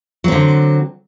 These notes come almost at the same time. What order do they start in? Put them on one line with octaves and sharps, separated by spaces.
F#3 C4 D3